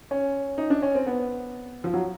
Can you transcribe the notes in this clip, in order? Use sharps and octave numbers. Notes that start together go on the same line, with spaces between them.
C#4
D#4
D4
C#4
C4
B3
F3
F#3